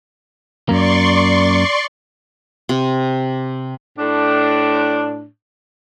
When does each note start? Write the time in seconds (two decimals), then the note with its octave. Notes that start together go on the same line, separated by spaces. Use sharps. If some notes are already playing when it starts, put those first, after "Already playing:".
0.69 F#2 A#3 D5 C6 C#6
2.69 C3
3.98 A2 D4